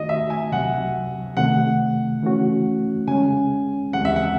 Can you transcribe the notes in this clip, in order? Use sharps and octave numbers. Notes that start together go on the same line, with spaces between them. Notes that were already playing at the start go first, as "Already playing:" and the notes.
Already playing: D#3 A3 D#4 F#4 D#5
E5
G#5
C#2 C3 F#3 F#5
C3 D#3 A3 F#5
C#3 E3 A3 C#4 F#4
C#3 G#3 C#4 G#5
D#2 C#3 E3 G#3 C4 F#5
E5
F#5